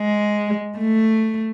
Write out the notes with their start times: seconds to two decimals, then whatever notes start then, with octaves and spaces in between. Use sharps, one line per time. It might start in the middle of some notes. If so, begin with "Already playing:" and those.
Already playing: G#3
0.78 A3